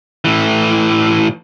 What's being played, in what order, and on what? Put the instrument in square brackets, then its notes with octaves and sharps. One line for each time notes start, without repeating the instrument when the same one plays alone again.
[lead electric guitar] A2 E3